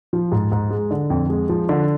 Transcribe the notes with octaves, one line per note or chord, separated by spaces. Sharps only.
F3
G#2
G#2
G#3
D3
F2
G#3
F3
D3